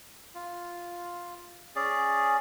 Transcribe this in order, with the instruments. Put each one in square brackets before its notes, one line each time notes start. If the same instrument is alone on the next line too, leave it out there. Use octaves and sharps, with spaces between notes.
[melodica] F4
C#4 G#4 D5